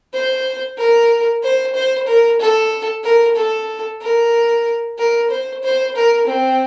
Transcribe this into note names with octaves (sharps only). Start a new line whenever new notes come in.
C5
A#4
C5
C5
A#4
A4
A#4
A4
A#4
A#4
C5
C5
A#4
C4